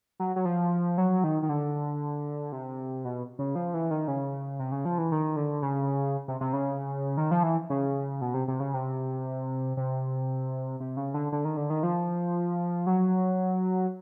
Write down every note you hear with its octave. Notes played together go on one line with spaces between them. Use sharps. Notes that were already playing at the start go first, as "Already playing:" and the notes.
F#3
F#3
F3
F#3
D#3
D#3
D3
C3
B2
C#3
F3
E3
D#3
C#3
C3
C#3
F3
E3
D#3
D3
C#3
C3
C3
C#3
D#3
F3
E3
C#3
B2
C3
C3
C#3
C3
C3
C3
C#3
D3
D3
D#3
D3
D#3
F3
F#3